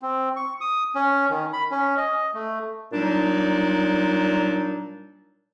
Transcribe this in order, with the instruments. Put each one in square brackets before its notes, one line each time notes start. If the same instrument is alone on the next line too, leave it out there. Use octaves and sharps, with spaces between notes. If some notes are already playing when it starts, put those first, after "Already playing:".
[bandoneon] C4
C#6
D#6
C#4
D#3
B5
C#4
D#5
A3
[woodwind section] A#2 F#3 G3 D4 D#4